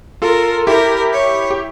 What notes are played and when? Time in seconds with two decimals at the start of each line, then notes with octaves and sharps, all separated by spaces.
0.22 F4 A4 A#4
0.67 E4 G4 A#4
1.13 C#5
1.50 G4